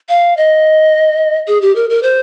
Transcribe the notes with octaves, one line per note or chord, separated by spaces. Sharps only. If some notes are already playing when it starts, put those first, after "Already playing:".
F5
D#5
G#4
G4
A#4
A#4
C5